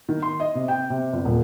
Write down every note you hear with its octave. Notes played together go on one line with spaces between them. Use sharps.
D#3
C6
D#5
C3
G5
C3
G1
D#1